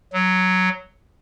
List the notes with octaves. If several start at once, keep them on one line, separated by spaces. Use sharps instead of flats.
F#3